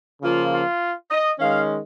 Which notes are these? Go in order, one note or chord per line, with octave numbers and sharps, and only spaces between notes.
C#3 F3 A#3 F4
F4
D#5
D#3 G#3 C#4 F5